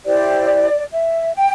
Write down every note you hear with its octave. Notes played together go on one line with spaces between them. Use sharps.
E4 G4 C5 D5
E5
G5